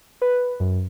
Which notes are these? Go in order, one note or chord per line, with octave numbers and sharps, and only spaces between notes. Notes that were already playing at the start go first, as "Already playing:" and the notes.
B4
F#2